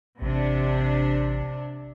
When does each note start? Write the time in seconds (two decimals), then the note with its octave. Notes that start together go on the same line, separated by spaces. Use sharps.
0.22 A1 C3 D4